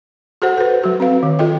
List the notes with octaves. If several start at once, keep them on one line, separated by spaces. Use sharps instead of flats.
F#4 G#4 A4 C5 F#5
A4 B4
F#3 F#4
C4 B4 F5
D#3
F4 G#4 A4 D#5 G5